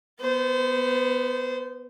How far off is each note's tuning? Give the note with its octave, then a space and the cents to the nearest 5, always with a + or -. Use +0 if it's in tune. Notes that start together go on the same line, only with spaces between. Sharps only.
B3 +0 C5 -25